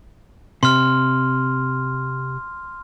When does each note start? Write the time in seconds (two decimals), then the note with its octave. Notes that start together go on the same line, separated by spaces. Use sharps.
0.63 C3 C6 F6